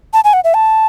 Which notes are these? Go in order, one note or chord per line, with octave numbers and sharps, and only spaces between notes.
A5
G#5
F#5
E5
A5